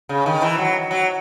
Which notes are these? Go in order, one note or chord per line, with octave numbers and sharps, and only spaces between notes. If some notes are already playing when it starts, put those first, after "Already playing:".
C#3
D#3
E3
F#3
F#3